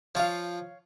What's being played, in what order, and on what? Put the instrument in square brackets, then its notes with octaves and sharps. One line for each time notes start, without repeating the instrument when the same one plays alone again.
[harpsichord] F3 F4 [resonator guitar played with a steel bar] C#5 F5